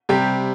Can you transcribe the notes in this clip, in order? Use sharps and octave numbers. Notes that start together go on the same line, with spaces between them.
C3 G3 G4